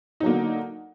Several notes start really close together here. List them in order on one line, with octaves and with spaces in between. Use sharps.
D#4 F#3 A#3 D3